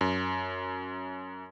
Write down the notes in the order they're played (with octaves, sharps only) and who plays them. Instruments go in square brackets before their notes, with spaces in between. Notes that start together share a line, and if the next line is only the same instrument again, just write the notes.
[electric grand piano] F#2